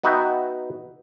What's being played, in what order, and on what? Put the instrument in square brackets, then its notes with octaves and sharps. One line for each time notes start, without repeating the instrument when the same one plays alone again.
[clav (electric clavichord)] B3 D#4 F#4 B4 E5 G5